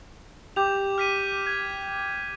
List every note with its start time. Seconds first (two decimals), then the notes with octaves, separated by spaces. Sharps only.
0.56 G4 D6 G6 F7
0.98 F6 B6 D#7
1.47 G#6